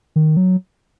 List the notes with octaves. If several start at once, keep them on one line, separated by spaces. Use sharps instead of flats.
D#3
F#3